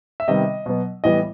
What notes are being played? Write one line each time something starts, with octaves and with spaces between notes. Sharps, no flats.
E5
C3 D#3 G3 B3 D#5
B2 F#3 B3
A2 E3 G3 B3 D#5